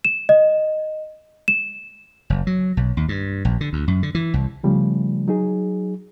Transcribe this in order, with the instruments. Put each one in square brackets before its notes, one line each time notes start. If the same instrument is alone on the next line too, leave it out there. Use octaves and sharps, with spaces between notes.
[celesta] E7
D#5
E7
[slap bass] F#1
F#3
B1
D#2
G2
A#1
D3
D2
F#2
D3
E3
C2
[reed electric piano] C#3 F3 G3 A3
F#3 D#4 G#4